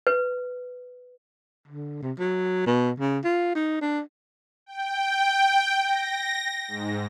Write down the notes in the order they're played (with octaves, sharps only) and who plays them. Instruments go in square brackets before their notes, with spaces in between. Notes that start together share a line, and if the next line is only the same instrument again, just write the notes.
[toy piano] B4
[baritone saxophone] D3
C3
F#3
B2
C#3
F4
D#4
D4
[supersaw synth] G5
A#6
G#2